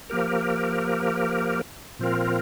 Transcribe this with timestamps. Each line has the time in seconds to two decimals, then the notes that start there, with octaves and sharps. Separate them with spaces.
0.10 F3 A#3 G4 A#4
1.99 A#2 F3 C4 F4 A#4